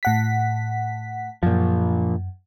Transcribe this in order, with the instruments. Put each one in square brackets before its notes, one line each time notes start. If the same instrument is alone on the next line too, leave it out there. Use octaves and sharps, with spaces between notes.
[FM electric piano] A2 F#5 B6
[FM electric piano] F#2 [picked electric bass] A#2 F3